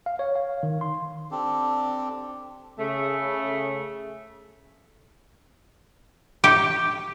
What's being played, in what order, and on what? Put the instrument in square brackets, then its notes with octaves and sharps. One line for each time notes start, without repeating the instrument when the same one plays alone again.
[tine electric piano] F5
C#5
F5
D#3
C6
[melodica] C4 D4 G4 A4
[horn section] C#3 A3
[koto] G4